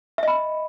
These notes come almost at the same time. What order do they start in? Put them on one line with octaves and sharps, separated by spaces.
E5 D#5 B5